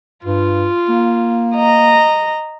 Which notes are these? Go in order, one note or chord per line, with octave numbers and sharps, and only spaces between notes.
G2 F4
A#3
D#5 A#5